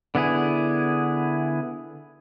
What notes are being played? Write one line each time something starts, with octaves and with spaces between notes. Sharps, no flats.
D3 B3 E4 G#4